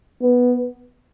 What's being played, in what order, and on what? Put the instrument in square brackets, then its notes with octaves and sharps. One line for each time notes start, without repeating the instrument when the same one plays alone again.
[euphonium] B3